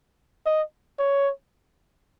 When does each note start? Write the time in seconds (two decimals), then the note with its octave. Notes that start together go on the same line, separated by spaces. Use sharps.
0.46 D#5
0.99 C#5